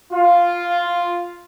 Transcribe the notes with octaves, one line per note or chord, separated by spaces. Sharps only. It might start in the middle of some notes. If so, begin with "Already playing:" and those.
F4